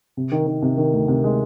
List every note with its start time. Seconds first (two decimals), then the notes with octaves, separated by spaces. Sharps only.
0.17 C3
0.32 D#3
0.47 D#3
0.62 C3
0.77 D#3
0.93 D2
1.08 C3
1.24 G#3